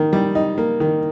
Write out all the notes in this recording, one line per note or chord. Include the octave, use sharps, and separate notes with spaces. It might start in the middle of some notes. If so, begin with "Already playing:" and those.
Already playing: D#3 A#3
G3
D#4
A#3
D#3